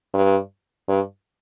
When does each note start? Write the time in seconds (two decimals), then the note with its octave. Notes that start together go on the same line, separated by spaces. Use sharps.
0.14 G2
0.88 G2